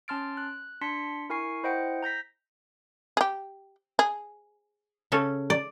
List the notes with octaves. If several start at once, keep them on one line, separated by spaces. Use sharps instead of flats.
C#4 A5 C6 F6 A6 D7
F#6
D4 A5 C6 B6 C#7
E4 A#4 G#5 C#6 C7
E4 C5 D#5 F#5 G5 D7
A#5 G6 A#6 B6
G4 G#4
G#4
C#3 C#4 A4
D5